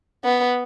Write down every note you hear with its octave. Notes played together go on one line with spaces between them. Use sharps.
B3